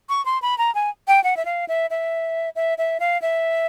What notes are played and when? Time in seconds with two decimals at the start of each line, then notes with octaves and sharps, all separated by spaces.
0.09 C#6
0.26 C6
0.42 B5
0.58 A#5
0.75 G#5
1.08 G5
1.24 F#5
1.37 E5
1.45 F5
1.68 E5
1.90 E5
2.56 E5
2.78 E5
3.00 F5
3.22 E5